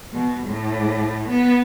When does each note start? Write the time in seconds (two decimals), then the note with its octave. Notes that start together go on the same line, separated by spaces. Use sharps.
0.13 B2
0.47 A2
1.29 B3